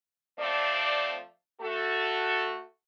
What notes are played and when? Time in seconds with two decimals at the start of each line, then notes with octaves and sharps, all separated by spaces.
0.39 F3 A3 C4 D5
1.61 A3 F#4 A4